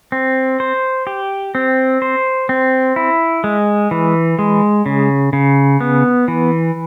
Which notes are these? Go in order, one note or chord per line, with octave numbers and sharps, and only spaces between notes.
C4
C5
G4
C4
C5
C4
E4
G#3
E3
G#3
C#3
C#3
B3
E3